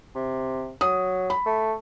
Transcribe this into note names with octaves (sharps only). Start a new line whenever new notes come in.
C3
F#3 D#6
B5
A3